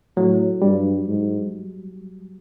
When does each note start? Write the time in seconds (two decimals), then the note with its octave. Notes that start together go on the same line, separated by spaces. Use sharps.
0.17 A2 F#3
0.62 G2 G3
1.07 G#2